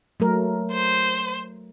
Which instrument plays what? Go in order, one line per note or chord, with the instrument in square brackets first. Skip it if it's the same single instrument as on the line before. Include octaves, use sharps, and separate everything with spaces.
[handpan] F#3 A3 A#4
[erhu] C5